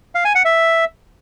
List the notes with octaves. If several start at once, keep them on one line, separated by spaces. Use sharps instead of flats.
F5
G#5
F#5
E5